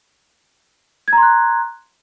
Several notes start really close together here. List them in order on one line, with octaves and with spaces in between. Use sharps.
G#6 A#5 C6 F#6